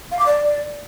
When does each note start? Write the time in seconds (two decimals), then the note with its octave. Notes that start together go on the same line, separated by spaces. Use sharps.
0.12 F5
0.19 D6
0.26 D5